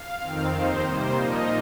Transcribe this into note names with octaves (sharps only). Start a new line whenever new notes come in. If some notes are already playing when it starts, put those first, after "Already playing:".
Already playing: F5
F2 D#3 C4
D#2 D#3 C4 D#4 C5
C3 G3 A#3 C5
A#2 F3 A#3 D#4 D#5